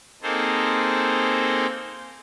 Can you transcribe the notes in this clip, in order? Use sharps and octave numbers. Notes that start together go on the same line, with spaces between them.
A#3 C4 D#4 G#4 A4 C5